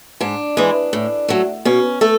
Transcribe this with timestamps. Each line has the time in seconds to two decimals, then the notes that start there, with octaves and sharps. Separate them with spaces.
0.21 G#2 D4
0.57 E3 G#3
0.93 A2
1.28 F#3 A3
1.65 B2 C#4
2.01 A3 A4